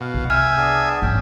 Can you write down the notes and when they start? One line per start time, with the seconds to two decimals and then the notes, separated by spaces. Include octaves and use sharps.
0.01 B2 F5
0.14 C2
0.30 E5 G5 G#5 F6
0.57 B3 D4 G#4
1.02 A1 G#2 C#4 G5